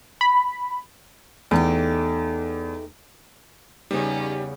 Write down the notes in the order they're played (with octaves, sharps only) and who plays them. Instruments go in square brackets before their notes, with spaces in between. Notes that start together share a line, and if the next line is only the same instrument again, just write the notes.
[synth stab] B5
[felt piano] E2 [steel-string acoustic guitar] A3 D#4 G4
[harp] E2 C#3 B3 [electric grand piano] G3 [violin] C#4 [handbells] D#4